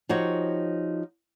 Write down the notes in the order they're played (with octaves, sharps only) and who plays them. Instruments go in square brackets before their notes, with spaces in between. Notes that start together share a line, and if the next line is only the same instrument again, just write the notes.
[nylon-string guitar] F3 D#4 F#4 G4 C#5